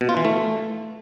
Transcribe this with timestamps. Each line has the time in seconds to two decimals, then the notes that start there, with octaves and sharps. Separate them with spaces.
0.01 B2
0.09 F4
0.17 E3
0.25 A3